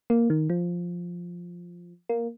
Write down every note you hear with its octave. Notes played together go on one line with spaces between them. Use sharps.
A#3
D#3
F3
A#3